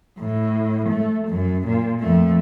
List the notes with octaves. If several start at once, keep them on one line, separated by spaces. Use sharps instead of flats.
A2
A3
F#2
A#2
F2 A3